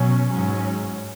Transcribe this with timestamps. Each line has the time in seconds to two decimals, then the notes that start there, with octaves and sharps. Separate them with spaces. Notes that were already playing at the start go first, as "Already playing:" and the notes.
Already playing: B2 F#3 C#4
0.29 G#2 F#3 C#4